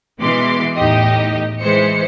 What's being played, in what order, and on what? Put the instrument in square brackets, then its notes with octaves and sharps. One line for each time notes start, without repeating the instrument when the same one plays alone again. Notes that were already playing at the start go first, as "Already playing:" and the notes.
[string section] B2 E3 G#3 C6 D6
E2 A2 D#4 G4 D#5
E3 G#3 C5 C#7